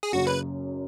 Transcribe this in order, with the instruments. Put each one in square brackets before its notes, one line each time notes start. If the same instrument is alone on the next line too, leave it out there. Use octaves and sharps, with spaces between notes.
[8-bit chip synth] G#4
[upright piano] F#1 F#2 C#3 [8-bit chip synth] F#4
[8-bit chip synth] B4